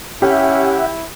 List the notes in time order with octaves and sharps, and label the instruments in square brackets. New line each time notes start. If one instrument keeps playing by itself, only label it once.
[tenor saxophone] C#4 [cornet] E4 [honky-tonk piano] G4 [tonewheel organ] E5 F#5